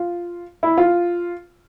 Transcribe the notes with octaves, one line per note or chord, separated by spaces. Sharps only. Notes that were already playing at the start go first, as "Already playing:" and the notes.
Already playing: F4
E4
F4